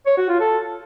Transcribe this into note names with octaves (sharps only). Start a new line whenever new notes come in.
C#5
F#4
F4
A4